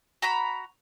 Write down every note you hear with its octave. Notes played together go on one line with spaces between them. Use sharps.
F#4 A#5 B5